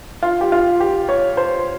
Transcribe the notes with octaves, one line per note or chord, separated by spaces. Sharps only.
F4
G4
F4
G4
C#5
C5